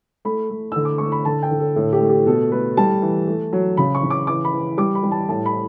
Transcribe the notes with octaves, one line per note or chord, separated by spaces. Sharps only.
A3 B5
A3
D3 E6
D6
A3 C#6
B5
D3 A5
G5
D3
A4
A2 A4
G4
A3
G4
B2 A4
A3 B4
G3 A5
E3
A3
F#3
C#3 B5
C#6
C#3
D6
E3 D6
B5
E3
G3 D6
B5
G3
A5
A2 A5
B5